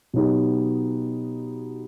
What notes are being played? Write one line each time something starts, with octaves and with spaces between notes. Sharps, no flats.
B2 F#3 B3 D#4 G4